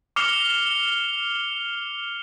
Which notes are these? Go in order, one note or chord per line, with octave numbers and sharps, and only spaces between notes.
D6 F6 C7 C#7 F7 G7